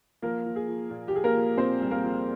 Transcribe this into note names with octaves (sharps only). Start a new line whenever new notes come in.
F3 A#3 A#4
F3
G#4
F3
A#2
G4
F3 G#4
A#3 A#4
F3
A#2 C4 C5
C2
A#3 A#4
F3